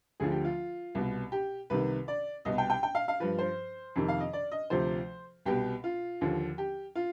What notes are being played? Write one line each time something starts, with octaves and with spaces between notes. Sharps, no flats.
D2 D3 F3 G#4
G4
F4
C2 B2
G4
C2 C3 D#3 B4
D5
C2 B2 D#5
G5
G5
G5
F5
F5
G2 F3 B4
C5
F2 C3 D#3
F5
D#5
D5
D#5
D2 C3 F3 C5
C2 B2 G4
F4
D#2 D3 F3
G4
F4